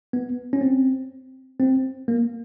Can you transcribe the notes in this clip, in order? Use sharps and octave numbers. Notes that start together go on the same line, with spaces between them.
B3
C#4
C4
C4
A#3